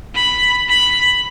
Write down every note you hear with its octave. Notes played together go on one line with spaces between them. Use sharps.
B5
B5